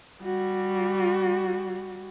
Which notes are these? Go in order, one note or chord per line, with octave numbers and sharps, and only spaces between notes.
G3 F#4